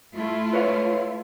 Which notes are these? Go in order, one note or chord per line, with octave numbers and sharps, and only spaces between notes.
A3 E4 F4
B4 C#5 F5